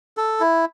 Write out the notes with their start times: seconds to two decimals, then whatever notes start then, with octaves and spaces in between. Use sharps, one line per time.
0.17 A4
0.40 E4